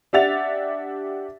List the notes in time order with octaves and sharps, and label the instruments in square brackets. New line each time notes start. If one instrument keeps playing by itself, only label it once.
[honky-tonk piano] D4 G4 E5 F#5 A6 F7